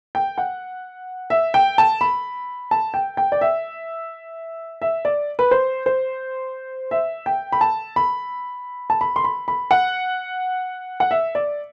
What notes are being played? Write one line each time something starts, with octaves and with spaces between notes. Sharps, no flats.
G5
F#5
E5
G5
A5
B5
A5
G5
G5
D5
E5
E5
D5
B4
C5
C5
E5
G5
B5
A5
B5
A5
B5
C6
B5
B5
F#5
F#5
E5
D5